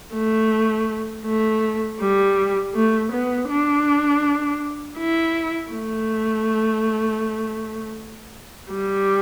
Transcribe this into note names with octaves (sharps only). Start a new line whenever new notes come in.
A3
A3
G3
A3
B3
D4
E4
A3
G3